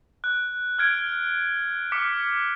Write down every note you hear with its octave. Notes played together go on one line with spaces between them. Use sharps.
F#6
F6 G#6 D7
D6 F6 B6 C#7